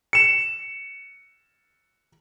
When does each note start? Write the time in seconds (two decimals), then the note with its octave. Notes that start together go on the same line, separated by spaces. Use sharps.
0.13 C#7 E7